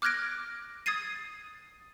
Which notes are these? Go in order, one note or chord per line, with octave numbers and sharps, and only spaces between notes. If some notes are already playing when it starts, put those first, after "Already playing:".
D6 F6 F#6 G#6 A#6 D7
D#6 G#6 A6 C7 D#7